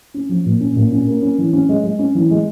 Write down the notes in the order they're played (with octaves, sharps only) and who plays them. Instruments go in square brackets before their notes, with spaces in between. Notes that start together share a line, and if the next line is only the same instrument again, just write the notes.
[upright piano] C#4
F3
A#2
C#4
A#2
C#4
A#3
C#4
E3
C#4
G#3
G#3
C#4
E3
G#3